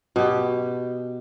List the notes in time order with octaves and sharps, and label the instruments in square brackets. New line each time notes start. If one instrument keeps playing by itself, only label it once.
[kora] B2 G4